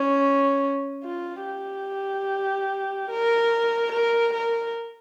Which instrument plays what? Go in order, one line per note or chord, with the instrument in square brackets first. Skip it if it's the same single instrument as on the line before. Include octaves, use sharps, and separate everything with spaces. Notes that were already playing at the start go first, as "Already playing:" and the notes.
Already playing: [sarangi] C#4
F4
G4
A#4
A#4
A#4